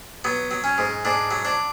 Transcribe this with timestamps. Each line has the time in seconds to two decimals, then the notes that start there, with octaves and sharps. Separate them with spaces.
0.24 F#3 B3
0.51 F#3
0.64 C#4
0.78 G#2
1.05 G#2 D4
1.31 F#3
1.45 D4